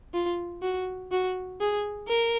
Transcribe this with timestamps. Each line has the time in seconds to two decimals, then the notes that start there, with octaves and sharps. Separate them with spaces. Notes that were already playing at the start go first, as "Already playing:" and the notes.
0.14 F4
0.63 F#4
1.12 F#4
1.61 G#4
2.08 A#4